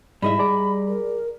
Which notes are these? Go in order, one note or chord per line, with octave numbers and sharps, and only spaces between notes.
G#2 G3 G#3 E4 D#5 E5 B5
G#4 D5 A#5
A#4